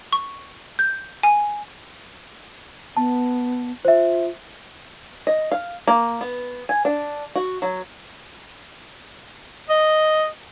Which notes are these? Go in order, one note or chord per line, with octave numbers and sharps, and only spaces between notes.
C#6
G6
G#5
B3 A5
F4 C5 E5
D#5
F5
A#3
B3
G#5
D4
F#4
F#3
D#5